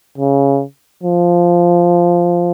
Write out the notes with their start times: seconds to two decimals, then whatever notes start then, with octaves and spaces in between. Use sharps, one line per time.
0.18 C#3
1.03 F3